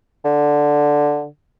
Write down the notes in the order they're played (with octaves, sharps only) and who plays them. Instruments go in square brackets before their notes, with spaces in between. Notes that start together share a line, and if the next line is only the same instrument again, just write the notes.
[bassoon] D3